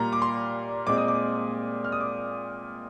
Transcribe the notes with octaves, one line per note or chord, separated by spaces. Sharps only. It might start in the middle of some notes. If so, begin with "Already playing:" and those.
Already playing: A#2 G3 A#3 A#5
D6
C6
A#2 G#3 C4 D6
D#6
D6
F6
D#6
D6